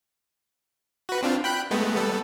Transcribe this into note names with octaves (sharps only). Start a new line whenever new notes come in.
F#4 B4
C4 D4 F4
G5 B5 F#6
G#3 A3 B3
G3 B3 A4